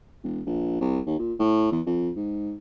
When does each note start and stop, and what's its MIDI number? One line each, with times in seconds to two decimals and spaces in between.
0.24 0.41 28
0.46 0.76 34
0.81 1.00 36
1.06 1.18 39
1.19 1.33 46
1.39 1.71 45
1.72 1.81 40
1.86 2.10 41
2.16 2.54 44